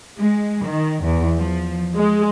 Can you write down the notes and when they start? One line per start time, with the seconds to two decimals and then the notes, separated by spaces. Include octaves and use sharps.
0.19 G#3
0.67 D#3
1.04 E2
1.38 F3
1.96 G#3